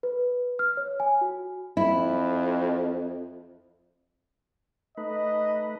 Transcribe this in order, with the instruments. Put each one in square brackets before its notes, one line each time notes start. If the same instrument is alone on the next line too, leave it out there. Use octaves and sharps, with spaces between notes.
[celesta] B4
F6
C#5
G#5
F#4
[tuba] F2 [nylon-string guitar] E4
[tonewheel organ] A3 D#4 B4 [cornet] D#5